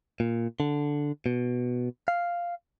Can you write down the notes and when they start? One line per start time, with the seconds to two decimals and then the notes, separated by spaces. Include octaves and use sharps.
0.20 A#2
0.60 D3
1.26 B2
2.08 F5